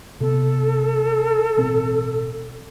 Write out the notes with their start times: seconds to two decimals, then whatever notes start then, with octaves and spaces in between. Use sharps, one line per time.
0.21 C3 B3 A4
1.57 A1 B2 C4